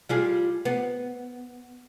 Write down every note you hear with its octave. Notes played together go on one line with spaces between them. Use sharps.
G3 F4 G#4
B3